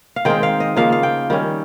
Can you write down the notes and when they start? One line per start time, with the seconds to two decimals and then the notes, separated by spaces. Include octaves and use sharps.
0.16 F5
0.25 D#3 G#3 C4 D#4 G5
0.43 F5
0.60 D#5
0.77 C#3 F3 A#3 D#4 F5
0.92 F5
1.03 G5
1.30 D#3 G3 C#4